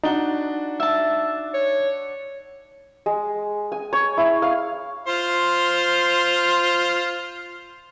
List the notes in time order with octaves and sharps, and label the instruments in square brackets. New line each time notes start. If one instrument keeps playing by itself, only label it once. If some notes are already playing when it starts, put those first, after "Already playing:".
[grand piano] D4 F#4 G7 [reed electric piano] D#4
[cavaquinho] E5 A5
[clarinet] C#5
[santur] G#3
G#5
C#5
E4
F5
[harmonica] F4 C5